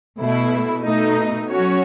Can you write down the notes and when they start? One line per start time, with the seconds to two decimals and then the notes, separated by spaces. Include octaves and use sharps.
0.18 B2 A3 E4
0.83 B2 A3 D#4
1.50 F#3 C#4 F#4 C#5